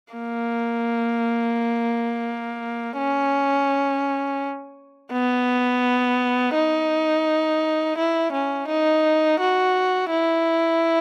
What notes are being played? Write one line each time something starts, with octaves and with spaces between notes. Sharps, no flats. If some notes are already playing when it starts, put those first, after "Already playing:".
A#3
C#4
B3
D#4
E4
C#4
D#4
F#4
E4